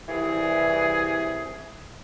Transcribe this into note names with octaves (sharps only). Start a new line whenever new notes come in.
C2 E3 G#4